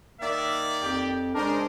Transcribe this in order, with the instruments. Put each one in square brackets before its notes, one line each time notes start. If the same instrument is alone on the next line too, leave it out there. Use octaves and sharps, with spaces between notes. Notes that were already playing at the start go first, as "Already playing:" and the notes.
[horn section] D#3 A#3 D5 [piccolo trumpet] E5
[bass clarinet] F2 [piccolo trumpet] G4
[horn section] C#3 G#3 C5 [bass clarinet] D4 [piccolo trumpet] A#4